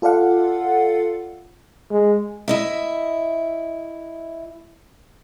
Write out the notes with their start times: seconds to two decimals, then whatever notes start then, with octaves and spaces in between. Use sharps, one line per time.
0.02 F4 A4 D5 F5 F#5
1.91 G#3
2.48 E4 D#5 E5